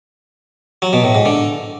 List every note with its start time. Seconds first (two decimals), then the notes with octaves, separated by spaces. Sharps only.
0.82 F#3
0.93 B2
1.04 A2
1.15 G#2
1.25 D3